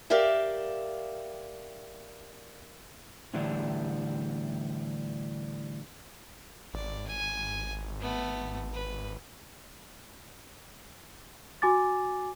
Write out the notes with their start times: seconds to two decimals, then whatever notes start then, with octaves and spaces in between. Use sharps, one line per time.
0.10 G4 A#4 D5 E5 F5 G5
3.34 A2 D3 E3 G3 D4
6.74 G#1 D5
7.07 G#5
8.00 A3 B3
8.73 B4
11.62 F#4 G#5 D6 A6